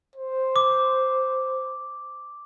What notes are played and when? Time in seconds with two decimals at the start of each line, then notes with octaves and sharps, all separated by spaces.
0.16 C5
0.56 D6